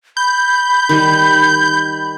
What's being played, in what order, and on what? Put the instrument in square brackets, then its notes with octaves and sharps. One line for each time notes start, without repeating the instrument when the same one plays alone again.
[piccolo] B5 [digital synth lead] G6
[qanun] D#3 G3